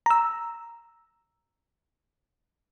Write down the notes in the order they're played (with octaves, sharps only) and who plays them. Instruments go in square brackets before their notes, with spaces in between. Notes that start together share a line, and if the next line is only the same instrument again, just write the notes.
[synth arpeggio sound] A#5 E6